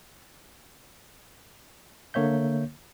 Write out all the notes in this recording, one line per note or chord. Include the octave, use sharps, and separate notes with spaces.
D3 A#3 C#5 E5 G6